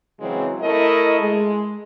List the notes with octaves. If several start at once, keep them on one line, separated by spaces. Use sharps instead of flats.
C#3 E3 F#3 G#3 C4
A3 E4 A#4 D#5
G#3